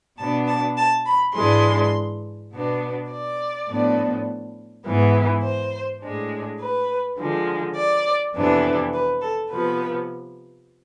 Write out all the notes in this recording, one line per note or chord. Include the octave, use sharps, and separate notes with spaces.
B2 B3 D4 A5
A5
A5
B5
G#2 E3 G#3 D4 C6
B2 B3 D4
D5
A2 F3 B3 D4
G#2 E3 B3
C5
A2 G#3 D4
B4
D3 F3 G#3
D5
F2 C3 E3 B3 D4
B4
A4
C3 F3 B3 B4